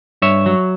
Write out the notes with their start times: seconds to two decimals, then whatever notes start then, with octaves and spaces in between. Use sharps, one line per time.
0.22 G2 C#5 E5
0.46 F#3